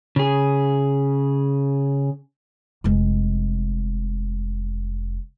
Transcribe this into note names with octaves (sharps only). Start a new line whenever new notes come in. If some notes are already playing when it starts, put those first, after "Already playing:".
C#3 G#4
F1 G#3